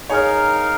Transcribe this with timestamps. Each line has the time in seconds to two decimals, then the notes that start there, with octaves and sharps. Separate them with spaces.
0.10 D#4 G#4 A#4 C#5 F5